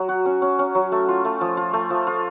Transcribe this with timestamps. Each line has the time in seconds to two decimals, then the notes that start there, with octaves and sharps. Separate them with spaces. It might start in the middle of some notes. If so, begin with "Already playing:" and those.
Already playing: F#3
0.09 F#4
0.26 C#4
0.42 C#4
0.59 C#4
0.75 F#3
0.92 A3
1.08 F4
1.25 A3
1.41 F3
1.57 F4
1.73 A3
1.90 F3
2.07 F4